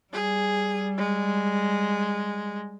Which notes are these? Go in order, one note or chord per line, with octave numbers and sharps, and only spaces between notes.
G3 G#4
G#3